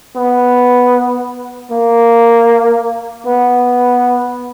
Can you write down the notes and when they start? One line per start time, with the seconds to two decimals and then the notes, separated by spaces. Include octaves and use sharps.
0.17 B3
1.72 A#3
3.26 B3